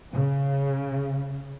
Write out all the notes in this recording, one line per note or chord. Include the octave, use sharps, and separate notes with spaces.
C#3